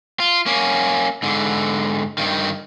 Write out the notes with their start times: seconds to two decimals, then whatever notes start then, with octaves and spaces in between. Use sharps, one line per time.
0.20 F4
0.46 A#3 C#4
1.23 G#2 D3
2.18 G2 D#3